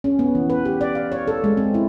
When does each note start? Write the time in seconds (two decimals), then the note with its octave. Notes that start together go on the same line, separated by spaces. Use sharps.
0.04 C#4
0.19 B3
0.35 E3
0.50 B4
0.65 G4
0.81 D5
0.95 F5
1.12 C#5
1.28 A4
1.44 G#3
1.57 C4
1.74 E4